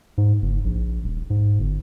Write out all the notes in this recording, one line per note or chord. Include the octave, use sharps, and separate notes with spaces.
G#2
F#1
A#1
D#1
G#2
G1